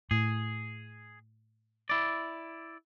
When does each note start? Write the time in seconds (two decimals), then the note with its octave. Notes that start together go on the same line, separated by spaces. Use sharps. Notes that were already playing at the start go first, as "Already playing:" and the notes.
0.11 A2 G#4
1.90 E4 D5